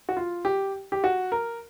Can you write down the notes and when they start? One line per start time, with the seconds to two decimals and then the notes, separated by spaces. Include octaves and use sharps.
0.09 F#4
0.17 F4
0.45 G4
0.92 G4
1.04 F#4
1.32 A#4